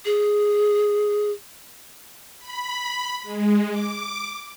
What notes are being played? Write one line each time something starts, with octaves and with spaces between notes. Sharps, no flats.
G#4
B5
G#3
D6